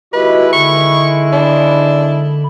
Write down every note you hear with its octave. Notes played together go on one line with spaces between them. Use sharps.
D#3 G#3 E4 F#4 G4 B4 D#5
D3 B5 C#6
D4